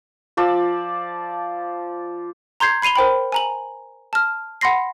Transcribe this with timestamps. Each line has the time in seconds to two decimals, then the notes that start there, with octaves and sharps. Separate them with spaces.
0.37 F3 D5 E6
2.60 A#5 C6 G6 G#6 C7
2.82 B5 C7 D#7 F7 G7
2.96 A#4 C5 G5 B5
3.32 G#5 A#5 F#7
4.13 A5 F6
4.61 F#5 B5 C6 A#6 C7